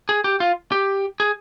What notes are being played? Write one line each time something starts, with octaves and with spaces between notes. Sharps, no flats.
G#4
G4
F4
G4
G#4